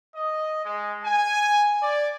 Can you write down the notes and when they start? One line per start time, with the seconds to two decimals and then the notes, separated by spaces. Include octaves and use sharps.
0.15 D#5
0.64 G#3
1.04 G#5
1.82 D5